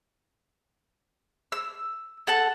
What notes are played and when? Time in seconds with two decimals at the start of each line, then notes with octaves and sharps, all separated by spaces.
1.52 E6
2.27 A4 F#5 A5